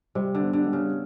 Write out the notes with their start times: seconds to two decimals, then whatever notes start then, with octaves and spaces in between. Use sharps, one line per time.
0.15 C3 G3
0.35 D3
0.41 B3
0.53 D3
0.66 G3
0.73 C#3